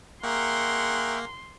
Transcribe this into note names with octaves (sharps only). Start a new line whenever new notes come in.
A#3 G#4 A#4 E5 F#5 G5 C6 C#6